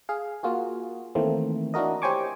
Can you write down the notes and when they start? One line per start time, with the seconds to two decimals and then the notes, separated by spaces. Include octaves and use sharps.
0.09 G#4 F5
0.43 A#3 F4 F#4 G#4
1.15 D#3 E3 A3 A#3 C4
1.74 D4 E4 F#4 A#4 D#5
2.02 G4 C5 C#5 G#5 C#6 D6